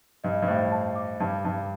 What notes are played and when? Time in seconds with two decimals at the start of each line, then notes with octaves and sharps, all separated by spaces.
0.24 G2 D#5
0.42 G2
0.48 A2 C5
0.72 A5
0.96 D6
1.20 G2 A5
1.45 G2 A5